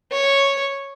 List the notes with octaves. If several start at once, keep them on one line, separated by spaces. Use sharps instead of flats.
C#5